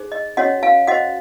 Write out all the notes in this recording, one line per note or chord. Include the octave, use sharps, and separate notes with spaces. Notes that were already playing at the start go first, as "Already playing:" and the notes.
Already playing: D#4 G#4 C5
D#5
C#4 F#4 C#5 D#5 F#5
F5 G#5
F#4 C5 D#5 F#5